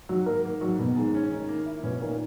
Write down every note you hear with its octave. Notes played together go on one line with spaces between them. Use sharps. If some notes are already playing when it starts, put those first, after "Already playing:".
D#3 F#3 F#4
G#2 A#3 A#4
A#3
G#2 F#3 F#4
B2 D#3 B3
G#2 G#3
C#4
D#3
A#3
E4
B2 B3 C#4
A#2 D#3 A#3